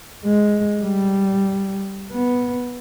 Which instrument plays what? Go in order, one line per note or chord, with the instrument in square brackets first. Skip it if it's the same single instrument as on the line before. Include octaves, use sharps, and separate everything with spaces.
[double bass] G#3
G3
B3